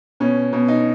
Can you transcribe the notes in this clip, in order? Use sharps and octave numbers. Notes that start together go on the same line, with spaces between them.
B2 C#4
B2
D#4